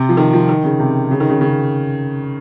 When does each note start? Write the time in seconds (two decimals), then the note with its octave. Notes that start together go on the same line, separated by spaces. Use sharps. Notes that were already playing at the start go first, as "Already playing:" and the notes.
Already playing: C3
0.09 F3
0.17 D#3
0.33 F3
0.49 D#3
0.64 C#3
0.80 C3
1.11 C#3
1.20 D#3
1.29 C#3
1.41 C#3